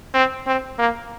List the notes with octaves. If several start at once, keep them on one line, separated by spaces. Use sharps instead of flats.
C4
C4
A#3